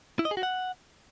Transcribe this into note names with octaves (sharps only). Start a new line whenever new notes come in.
E4
D#5
G#4
F#4
F#5